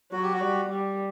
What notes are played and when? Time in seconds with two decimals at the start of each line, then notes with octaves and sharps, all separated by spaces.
0.12 F#3 F#4
0.23 G4
0.33 F#4
0.41 G3
0.69 G3